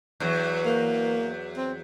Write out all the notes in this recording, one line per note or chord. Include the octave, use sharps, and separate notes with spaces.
E2 F#3
A#3
C4